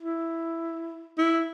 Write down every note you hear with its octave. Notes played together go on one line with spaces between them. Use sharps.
E4
E4